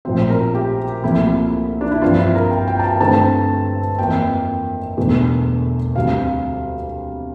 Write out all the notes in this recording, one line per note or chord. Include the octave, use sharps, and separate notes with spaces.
A#1 A2 F3 C4 C5
A#4
G4
C2 A#2 F3 A3 E4
D4
E4
G2 F3 C4 F4
E4
A#4
G5
G5
A5
G5
G2 D3 A3 C4 A5
F2 E3 A#3 G5
E1 E2 D3 A3
D2 C3 G3 F5